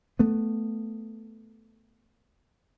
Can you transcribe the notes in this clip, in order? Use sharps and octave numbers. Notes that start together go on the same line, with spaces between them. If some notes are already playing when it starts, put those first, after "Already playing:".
A3 B3